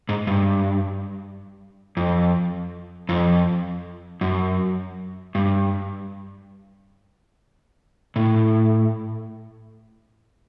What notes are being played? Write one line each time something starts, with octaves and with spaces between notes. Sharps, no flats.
G#2
G2
F2
F2
F#2
G2
A2